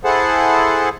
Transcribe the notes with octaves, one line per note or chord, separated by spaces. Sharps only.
E4 G#4 A4 C5 F#5 A5